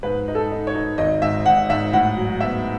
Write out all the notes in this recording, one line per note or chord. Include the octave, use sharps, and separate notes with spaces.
G#2 B4
D#4
A4
D#4
C#5
D#4
G#1 D#5
G#2 E5
G#2 F#5
G#2 E5
A2 F#5
F#3
B3 E5